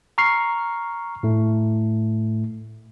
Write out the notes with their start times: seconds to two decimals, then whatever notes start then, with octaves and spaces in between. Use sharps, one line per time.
0.18 A#5 C#6 F6 C7
1.23 A2 A3